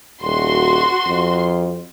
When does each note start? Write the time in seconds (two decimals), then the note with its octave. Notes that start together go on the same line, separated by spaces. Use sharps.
0.23 D#1 F#4 C6
1.06 F2